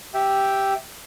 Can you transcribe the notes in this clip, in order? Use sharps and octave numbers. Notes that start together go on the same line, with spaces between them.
G4 E5 G5